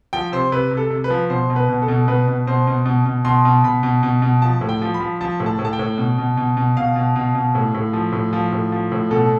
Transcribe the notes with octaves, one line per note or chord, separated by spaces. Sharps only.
F3 G5
C3 C5
C3 B4
C3
A4
C3
B4
F3
B2 C5
B2
B4
B2
A4
B2
B2 B4
B2
B2 C5
B2
B2
B2
B2 C6
B2
B2 B5
B2
B2
B2
F3 A5
A2
G5
F3
B5
F3
F3 A5
A2
A5
A2
A5
G5
A2
B2
B2
B2
B2
B2 F5
B2
B2
B2
A2
A2
F3
A2
F3
A2
F3
A2
B2 A4